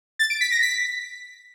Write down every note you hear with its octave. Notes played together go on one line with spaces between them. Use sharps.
A6
D7
B6
A#6
B6